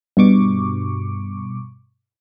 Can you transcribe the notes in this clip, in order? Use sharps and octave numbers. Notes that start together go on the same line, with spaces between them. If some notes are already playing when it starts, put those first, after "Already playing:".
G2 B2 C#6 D6